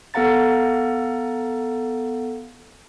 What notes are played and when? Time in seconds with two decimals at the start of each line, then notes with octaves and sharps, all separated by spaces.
0.14 B3 A4 F5 F#5 A#5 A6